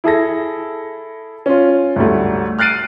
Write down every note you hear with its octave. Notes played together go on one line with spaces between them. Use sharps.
E4 G#4 A4 A#6
C#4 F4
D2 G#2 G3 A3
F6 F#6 A6 C7 D7 D#7